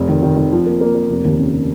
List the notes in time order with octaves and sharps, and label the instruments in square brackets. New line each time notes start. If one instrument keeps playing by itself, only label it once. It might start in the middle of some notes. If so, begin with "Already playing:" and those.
Already playing: [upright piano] F1 F2
D#3
D#3
D#3
F3
A#3
A#3
A#3
F1
D#2
C#3